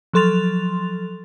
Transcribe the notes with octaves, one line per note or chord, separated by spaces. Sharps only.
F3 F#3 A4 C6 A6 F7